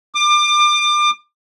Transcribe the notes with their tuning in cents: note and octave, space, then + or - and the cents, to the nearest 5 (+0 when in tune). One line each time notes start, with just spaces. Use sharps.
D6 +30